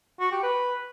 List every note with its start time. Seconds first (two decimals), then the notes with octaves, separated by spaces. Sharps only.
0.20 F#4
0.31 G4
0.43 B4